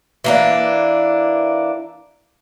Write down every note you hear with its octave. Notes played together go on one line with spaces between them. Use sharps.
E3 A#3 D4